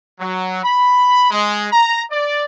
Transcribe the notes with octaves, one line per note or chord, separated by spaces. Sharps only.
F#3
B5
G#3
A#5
D5